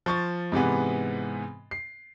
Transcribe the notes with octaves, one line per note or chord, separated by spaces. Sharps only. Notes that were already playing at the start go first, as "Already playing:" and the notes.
F3 C#6 A6
G#2 C3 E3 B3
C7